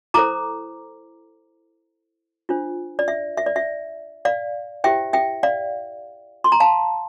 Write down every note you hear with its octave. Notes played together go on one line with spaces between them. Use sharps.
E4 A4 C5 A#5 D6
D4 F4 C5
D5
E5
E5
D5
E5
D5 F5
E4 G4 C5 E5 G5
E5 G5
D5 F5
C6
A#5
F5 A5